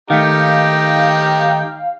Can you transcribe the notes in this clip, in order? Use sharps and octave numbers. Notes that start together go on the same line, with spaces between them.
D#3 A3 D#4 G4 F5 G5